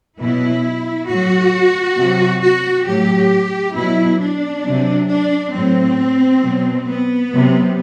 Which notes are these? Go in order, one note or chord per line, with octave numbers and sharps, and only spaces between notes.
B2 F#3 E4
A2 F#3 F#4
C3 F#3
F#4
A2 F#3 G4
B2 F#3 E4
D4
C3 F#3
D4
A2 F#3 C4
B2 F#3
B3
C3 F#3